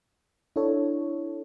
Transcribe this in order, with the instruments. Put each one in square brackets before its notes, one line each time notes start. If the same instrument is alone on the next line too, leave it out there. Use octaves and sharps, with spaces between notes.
[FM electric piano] D4 E4 A4 C#5